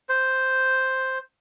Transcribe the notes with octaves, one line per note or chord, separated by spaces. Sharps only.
C5